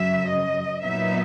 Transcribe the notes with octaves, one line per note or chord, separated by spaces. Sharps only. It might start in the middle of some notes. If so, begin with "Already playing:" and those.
Already playing: F#2 C#3 F#3 E5
D#5
A#2 F#3 B3 D#4 E5